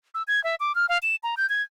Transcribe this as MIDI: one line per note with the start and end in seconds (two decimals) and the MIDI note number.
0.14 0.23 88
0.28 0.43 92
0.44 0.55 76
0.60 0.75 86
0.75 0.86 89
0.89 0.98 77
1.02 1.16 100
1.23 1.35 82
1.37 1.48 91
1.49 1.62 92